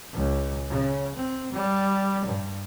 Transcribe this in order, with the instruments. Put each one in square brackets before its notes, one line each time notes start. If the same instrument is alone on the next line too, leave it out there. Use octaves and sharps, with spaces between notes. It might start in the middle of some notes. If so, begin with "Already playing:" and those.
[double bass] C#2
C#3
C4
G3
G2